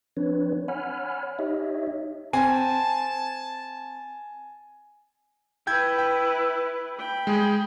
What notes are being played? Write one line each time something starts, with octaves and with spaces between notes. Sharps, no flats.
F3 C4 D4 B4 C#5
C#5 F#5 G#5 B5 F6
D#4 G4 C#5 D#5 E5
C4 G#5 A5
E4 B4 G5 G6 G#6
G5
G5 B5
G#3 G#4